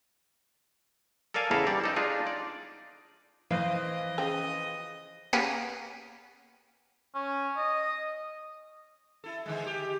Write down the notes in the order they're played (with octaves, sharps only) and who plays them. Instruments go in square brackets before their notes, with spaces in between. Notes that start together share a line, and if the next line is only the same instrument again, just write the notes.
[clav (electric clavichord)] A4 A#4 D5 F5 G#5 A5
E2 C#3 E4 A4 F5 A#5
G3 D5
D#4 A4
D4 D#4 F4 G#4
D5
[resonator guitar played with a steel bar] F2 C5 F5 [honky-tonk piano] E3 [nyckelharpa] D#5
[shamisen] C#3 F3 G5 [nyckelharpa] D#5
[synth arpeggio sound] A#3 B3 C#4 G4 G#4 B4
[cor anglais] C#4
D#5
[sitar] E4 A4
D3 D#3 G#3
G4